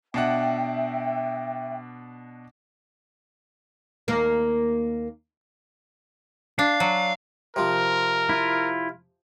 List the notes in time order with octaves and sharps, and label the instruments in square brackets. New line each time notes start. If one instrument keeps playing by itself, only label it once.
[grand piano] B2 D4 F#5 [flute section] E5 G5
[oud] D#2 A#3 A#4
[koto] D4 [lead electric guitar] F5
[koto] F#3
[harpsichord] C3 F3 [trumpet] A#4
[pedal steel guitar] E4 F4